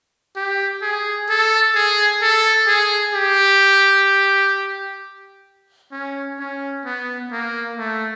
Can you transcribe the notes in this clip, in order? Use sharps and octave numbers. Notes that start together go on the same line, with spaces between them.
G4
G#4
A4
G#4
A4
G#4
G4
C#4
C#4
B3
A#3
A3